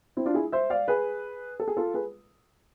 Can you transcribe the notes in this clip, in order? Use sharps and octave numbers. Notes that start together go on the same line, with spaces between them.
C4 E4
D4 F4
E4 G#4
C5 E5
D5 F5
G#4 B4
A4
G#4
F4 A4
G#4 B4